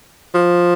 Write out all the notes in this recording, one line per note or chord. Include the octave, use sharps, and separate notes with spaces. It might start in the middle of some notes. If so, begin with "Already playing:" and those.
F3